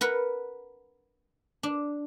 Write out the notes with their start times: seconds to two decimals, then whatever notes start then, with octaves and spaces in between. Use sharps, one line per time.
0.01 A#4 B4 F#5
1.63 D4